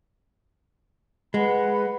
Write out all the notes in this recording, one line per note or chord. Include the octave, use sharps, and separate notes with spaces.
G#3 B4 F#5 B5